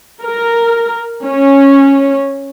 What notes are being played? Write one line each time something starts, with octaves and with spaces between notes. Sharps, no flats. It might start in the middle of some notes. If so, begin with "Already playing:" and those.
A#4
C#4